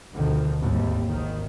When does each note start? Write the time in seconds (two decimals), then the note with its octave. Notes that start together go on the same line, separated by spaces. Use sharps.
0.14 D2 B2 D3 D#3 F3
0.61 G#1 D#2 G3
1.07 G#1 D#3